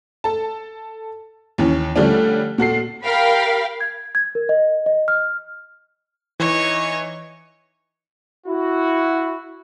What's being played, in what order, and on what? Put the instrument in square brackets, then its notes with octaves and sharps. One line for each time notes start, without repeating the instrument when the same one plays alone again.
[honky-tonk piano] A4 A5
D#2 E3 C#4
D3 F3 G3 A3 C#4 D4
A#2 F#4 A4 C7
[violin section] G4 A#4 F5 G5 B5
[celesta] G#6
G#6
A#4
D#5
D#5
F6
[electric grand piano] E3 [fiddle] D#4 C#5
[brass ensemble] E4 F#4